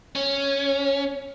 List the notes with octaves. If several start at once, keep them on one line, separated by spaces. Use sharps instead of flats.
C#4